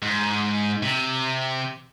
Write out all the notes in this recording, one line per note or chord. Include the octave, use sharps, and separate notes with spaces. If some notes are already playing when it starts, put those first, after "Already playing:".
G#2
C3